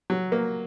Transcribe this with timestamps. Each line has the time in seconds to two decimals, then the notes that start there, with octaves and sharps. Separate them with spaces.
0.10 F#3
0.32 A#3